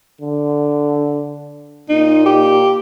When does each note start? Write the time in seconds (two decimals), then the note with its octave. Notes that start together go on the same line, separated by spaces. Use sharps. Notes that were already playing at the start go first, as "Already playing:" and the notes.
0.21 D3
1.89 A#2 D#4
2.26 G4